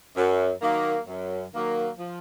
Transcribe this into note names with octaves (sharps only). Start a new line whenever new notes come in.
F#2
D#3 F#3 A#3
F#2
D#3 F#3 A#3
F3